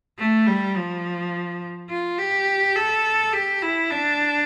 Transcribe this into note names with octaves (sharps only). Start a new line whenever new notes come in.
A3
G3
F3
F4
G4
A4
G4
E4
D4